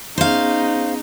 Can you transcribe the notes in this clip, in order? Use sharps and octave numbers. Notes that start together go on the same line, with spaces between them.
B3 C#4 D#4 G#4 C5 F5